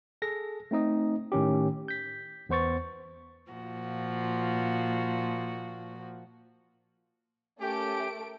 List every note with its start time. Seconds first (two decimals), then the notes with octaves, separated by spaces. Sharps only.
0.22 G#4 A4 A#6
0.71 A3 C4 D#4 D#5
1.32 A2 D#3 C#4 G4
1.88 G6 B6
2.49 E2 B3 C5 C#6 A6
3.49 A#2 F3 F#4
7.61 A3 C#4 G4 A#4 D7